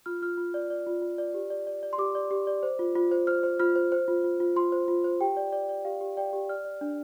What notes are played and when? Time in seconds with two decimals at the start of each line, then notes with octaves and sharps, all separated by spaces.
0.06 F4 F6
0.22 F4 F6
0.38 F4
0.54 D5
0.70 D5
0.86 F4
1.02 F4
1.18 D5
1.34 G4
1.50 D5
1.67 D5
1.83 D5
1.93 C6
1.98 G4 D6
2.15 D5
2.31 G4
2.47 D5
2.63 C5
2.79 F4
2.95 F4
3.11 C5
3.27 C5 F6
3.43 C5
3.59 F4 F6
3.76 C5
3.92 C5
4.08 F4
4.24 F4
4.40 F4
4.56 F4 C6
4.72 C5
4.88 F4
5.04 C5
5.20 G4 G5
5.37 D5
5.52 D5
5.69 D5
5.85 G4 F5
6.01 G4
6.17 D5 G5
6.33 G4
6.49 D5 F6
6.65 D5
6.81 D4